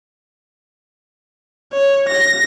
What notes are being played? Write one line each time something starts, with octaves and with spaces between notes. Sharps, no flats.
C#5
A#6